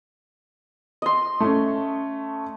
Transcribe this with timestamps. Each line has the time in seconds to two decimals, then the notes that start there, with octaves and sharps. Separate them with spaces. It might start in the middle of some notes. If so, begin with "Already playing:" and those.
1.02 D#5 C6
1.40 A3 C#4